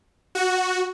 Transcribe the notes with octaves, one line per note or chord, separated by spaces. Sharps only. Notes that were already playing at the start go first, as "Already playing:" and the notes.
F#4